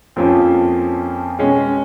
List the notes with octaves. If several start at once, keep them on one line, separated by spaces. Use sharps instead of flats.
F2 F3 A#3 C#4 F4
B2 G#3 C#4